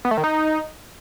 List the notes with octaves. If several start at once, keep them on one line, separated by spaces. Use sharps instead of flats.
B3
A3
D#3
D#4